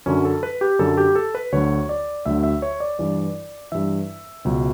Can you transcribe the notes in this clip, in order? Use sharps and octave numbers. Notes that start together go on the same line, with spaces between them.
F#2 D3 F#3 C#4
A4
B4
G4
F#2 D3 F#3 A4
G4
A4
B4
D2 D3 F#3 C#5
D5
D2 D3 F#3 E5
E5
C#5
D5
G2 E3 D5
G2 E3 E5
C#2 B2 F#3